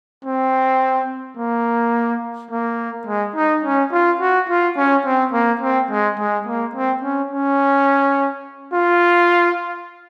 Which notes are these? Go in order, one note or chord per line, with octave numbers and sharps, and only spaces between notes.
C4
A#3
A#3
G#3
D#4
C#4
F4
F#4
F4
C#4
C4
A#3
C4
G#3
G#3
A#3
C4
C#4
C#4
F4